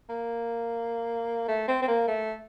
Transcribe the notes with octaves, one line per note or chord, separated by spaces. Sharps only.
A#3
A3
C4
C4
A#3
A3